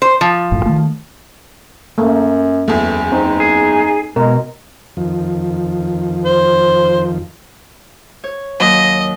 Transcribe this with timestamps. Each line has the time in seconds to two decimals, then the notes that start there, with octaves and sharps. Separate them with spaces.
0.02 C5
0.21 F3
0.52 F#1 A2
0.66 D#3 A3
1.98 F#2 A3 A#3
2.68 F#1 E2 A3
3.12 C4 D#4
3.40 G#4
4.16 B2 G#3 A#4
4.97 F2 D#3 F3
6.25 C5
8.24 C#5
8.60 D#2 F#3 D#5